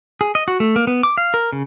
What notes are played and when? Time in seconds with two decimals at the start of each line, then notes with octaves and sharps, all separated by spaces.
0.21 G#4
0.35 D#5
0.48 F#4
0.60 A3
0.76 A#3
0.87 B3
1.03 D6
1.18 F5
1.34 A#4
1.53 C#3